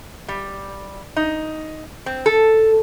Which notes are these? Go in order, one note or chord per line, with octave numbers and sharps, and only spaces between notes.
G3
D#4
C4
A4